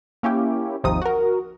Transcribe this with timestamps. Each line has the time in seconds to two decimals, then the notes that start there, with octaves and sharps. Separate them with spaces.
0.23 A#3 C#4 E4 G4
0.84 G#1 D#2 C3 F3 D#4 D#6
1.02 F#4 A#4